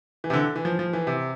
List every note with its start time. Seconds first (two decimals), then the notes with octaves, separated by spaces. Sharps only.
0.24 E3
0.30 C3
0.33 D3
0.56 E3
0.65 F3
0.79 F3
0.93 E3
1.07 C3